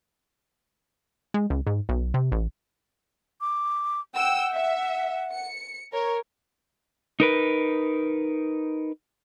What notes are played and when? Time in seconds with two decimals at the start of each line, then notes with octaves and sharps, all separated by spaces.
1.34 G#3
1.50 C#2
1.67 G#2
1.89 B1
2.14 C3
2.32 A1
3.41 D6
4.14 F#5 G5 E6
4.52 E5
5.33 C#7
5.92 A#4 C#5
7.20 D#4 A#4 B4